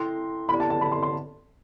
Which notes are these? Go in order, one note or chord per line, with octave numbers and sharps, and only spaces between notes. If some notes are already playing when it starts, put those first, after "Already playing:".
Already playing: E4 A4 E5 G5 C6
B3 E4 G4 D5 B5
A5
A5
B5
C6
C6